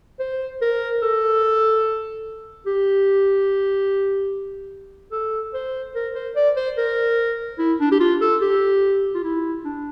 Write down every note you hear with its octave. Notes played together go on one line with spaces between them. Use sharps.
C5
A#4
A4
G4
A4
C5
A#4
C5
D5
C5
A#4
E4
D4
G4
F4
A4
G4
F4
E4
D4